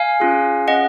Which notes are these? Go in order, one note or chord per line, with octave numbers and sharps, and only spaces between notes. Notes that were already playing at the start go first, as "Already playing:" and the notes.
Already playing: F5 G#5
C#4 F4 G#4
C#4 G#4 D#5 F#5